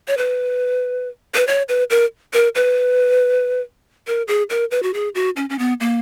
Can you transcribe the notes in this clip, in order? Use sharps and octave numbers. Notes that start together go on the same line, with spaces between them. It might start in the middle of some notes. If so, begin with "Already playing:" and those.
C#5
B4
B4
C#5
B4
A#4
A#4
B4
A#4
G#4
A#4
B4
F#4
G#4
F#4
C#4
C#4
B3
A#3